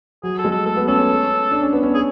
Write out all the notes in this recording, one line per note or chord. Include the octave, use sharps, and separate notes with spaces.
F#3 G#4
A4
G#3
A4
A3 A4
B3
C#4 A4
C#4
D4
C#4
B3
C#4
G#4